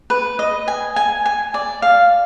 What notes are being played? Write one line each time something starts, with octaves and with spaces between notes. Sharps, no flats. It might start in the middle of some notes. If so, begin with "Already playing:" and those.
B4
D#5
G#5
G#5
G#5
D5
F5